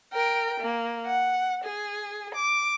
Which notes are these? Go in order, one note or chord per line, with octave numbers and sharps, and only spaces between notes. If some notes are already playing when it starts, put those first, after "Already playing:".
A#4 G5
A#3
F#5
G#4
D6